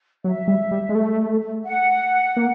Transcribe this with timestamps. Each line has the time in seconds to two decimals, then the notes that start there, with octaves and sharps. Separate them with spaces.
0.24 F#3 E5
0.48 G3
0.71 G3
0.89 G#3
0.95 A3
1.65 F#5
2.37 A#3